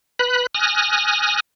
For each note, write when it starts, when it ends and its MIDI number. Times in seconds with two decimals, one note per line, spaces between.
0.19 0.47 71
0.19 0.47 83
0.19 0.47 90
0.55 1.40 80
0.55 1.40 87
0.55 1.40 89
0.55 1.40 90
0.55 1.40 94